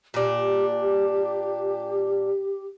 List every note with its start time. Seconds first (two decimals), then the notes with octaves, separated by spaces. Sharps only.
0.14 A#2 D4 G4